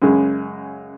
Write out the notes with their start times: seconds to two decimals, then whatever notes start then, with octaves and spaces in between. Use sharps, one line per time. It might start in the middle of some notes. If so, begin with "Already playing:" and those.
0.02 F#2 C#3 G#3